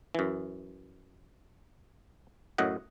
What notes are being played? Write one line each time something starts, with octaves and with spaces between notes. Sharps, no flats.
F#2 E3
F#2 A2 D#5 F#5